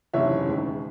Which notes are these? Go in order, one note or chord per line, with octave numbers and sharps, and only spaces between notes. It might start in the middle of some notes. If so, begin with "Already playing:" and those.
F#1 E2 C3 D#3 C#5 E5
E1 D#2 C#3 G#3